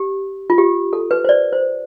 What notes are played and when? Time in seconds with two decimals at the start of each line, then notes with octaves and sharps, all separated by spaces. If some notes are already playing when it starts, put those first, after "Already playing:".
Already playing: G4
0.50 F4
0.58 G4
0.93 A4
1.11 B4
1.24 C5
1.29 D5
1.53 C5